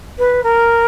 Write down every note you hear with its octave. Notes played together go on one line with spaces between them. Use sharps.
B4
A#4